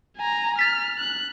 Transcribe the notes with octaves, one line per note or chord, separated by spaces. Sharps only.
G#5 A#5
F6 A6 B6
F#6